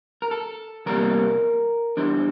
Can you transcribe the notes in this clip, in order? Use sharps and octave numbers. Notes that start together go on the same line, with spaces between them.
A#4
A4
E2 C3 G3 A#3 A#4
E2 E3 G3 D4 C5